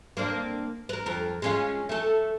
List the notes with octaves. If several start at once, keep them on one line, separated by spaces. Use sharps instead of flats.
A#3 C4 D4
A#4 B4
F2 A#4
G#3 C#4 F4
A3 A4